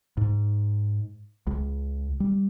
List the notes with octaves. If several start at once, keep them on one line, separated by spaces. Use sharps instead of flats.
G#2
C#2
G3